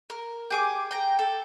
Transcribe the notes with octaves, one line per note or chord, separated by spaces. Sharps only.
A#4
G4 G#4 D6
G5 A#5
A4